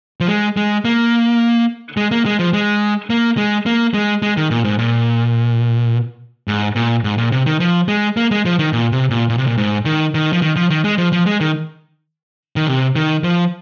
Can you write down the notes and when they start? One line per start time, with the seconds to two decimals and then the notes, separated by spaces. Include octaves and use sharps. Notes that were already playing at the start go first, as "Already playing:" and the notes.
0.20 F3
0.28 G#3
0.57 G#3
0.85 A#3
1.97 G#3
2.11 A#3
2.26 G#3
2.39 F3
2.53 G#3
3.10 A#3
3.37 G#3
3.66 A#3
3.94 G#3
4.22 G#3
4.37 D#3
4.51 A#2
4.64 G#2
4.79 A#2
6.48 G#2
6.76 A#2
7.04 G#2
7.18 A#2
7.32 C3
7.46 D#3
7.60 F3
7.88 G#3
8.17 A#3
8.31 G#3
8.45 F3
8.59 D#3
8.73 A#2
8.92 C3
9.10 A#2
9.29 A#2
9.38 C3
9.47 A#2
9.58 G#2
9.85 D#3
10.14 D#3
10.33 F3
10.42 D#3
10.56 F3
10.70 D#3
10.84 G#3
10.98 F3
11.12 F3
11.26 G#3
11.40 D#3
12.56 D#3
12.67 C3
12.96 D#3
13.24 F3